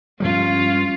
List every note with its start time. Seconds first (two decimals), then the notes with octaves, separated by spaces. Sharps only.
0.20 G2 F3 G3 C#4 F4